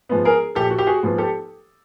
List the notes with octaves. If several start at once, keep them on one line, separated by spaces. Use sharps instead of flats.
G#2 F3 G#3 B3
G#4 A#4
A#1 G4 A4
F#4
G4
F#4 G#4
G#2 F3 G#3 B3
G4 A4